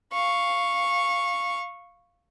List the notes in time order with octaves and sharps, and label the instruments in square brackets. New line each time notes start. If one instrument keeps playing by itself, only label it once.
[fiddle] F5 C#6